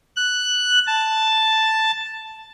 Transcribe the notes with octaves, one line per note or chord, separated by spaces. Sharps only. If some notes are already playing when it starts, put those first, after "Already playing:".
F#6
A5